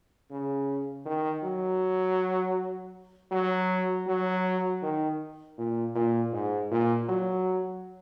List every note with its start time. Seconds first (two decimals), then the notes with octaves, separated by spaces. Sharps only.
0.31 C#3
1.06 D#3
1.44 F#3
3.31 F#3
4.07 F#3
4.83 D#3
5.58 A#2
5.95 A#2
6.33 G#2
6.71 A#2
7.09 F#3